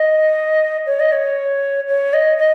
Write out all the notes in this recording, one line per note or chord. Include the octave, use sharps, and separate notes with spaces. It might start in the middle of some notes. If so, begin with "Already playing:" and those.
Already playing: D#5
C#5
D#5
C#5
C#5
D#5
D#5